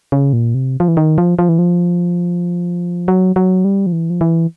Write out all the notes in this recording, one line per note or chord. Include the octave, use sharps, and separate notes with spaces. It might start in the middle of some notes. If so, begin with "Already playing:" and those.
C#3
A#2
C3
F3
E3
D#3
F3
F3
E3
F3
F#3
F#3
G3
F3
E3
F3
E3